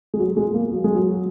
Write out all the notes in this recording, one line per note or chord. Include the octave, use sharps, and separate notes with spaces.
G#3
F#3
G#3
A#3
F#3
G#3
F#3